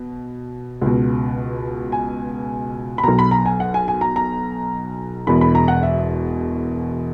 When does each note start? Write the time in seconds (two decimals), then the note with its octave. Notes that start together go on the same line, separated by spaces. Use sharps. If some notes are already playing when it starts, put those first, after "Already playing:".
Already playing: B2
0.81 C#2 B2
1.92 G#5
2.98 B5
3.04 B1 B2 A#5
3.19 B5
3.31 A#5
3.46 G#5
3.60 F#5
3.74 G#5
3.88 G#5
4.01 A#5
4.16 A#5
5.27 E1 E2 B2 B5
5.41 B5
5.55 A#5
5.68 F#5
5.83 E5